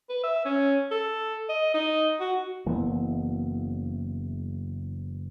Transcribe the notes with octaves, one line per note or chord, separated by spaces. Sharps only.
B4
E5
C#4
A4
D#5
D#4
F#4
F#1 E3 A#3 B3